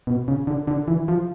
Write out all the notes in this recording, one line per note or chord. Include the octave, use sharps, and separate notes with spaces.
B2
C#3
D3
D3
E3
F3